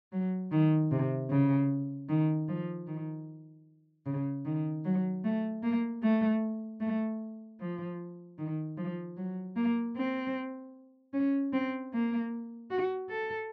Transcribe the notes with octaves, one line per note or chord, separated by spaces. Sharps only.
F#3
D#3
C3
C#3
D#3
F3
D#3
C#3
D#3
F#3
A3
A#3
A3
A3
F3
D#3
F3
F#3
A#3
C4
C#4
C4
A#3
F#4
A4